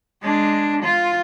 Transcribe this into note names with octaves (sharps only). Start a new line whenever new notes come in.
G#3 D4
F4